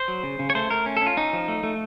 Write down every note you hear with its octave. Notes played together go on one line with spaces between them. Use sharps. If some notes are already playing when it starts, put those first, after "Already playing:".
Already playing: C5
F#3
C#3
C#3
C#5
A3 C5
A3 A#4
C#4
A4
C#4 F4
C#4 D#4
F3
A3
A3